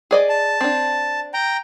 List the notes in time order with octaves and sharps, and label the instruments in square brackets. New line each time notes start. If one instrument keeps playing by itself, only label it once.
[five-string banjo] G#4 D5 D#5
[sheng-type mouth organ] A5
[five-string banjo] C4 D4
[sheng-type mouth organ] G5 A#5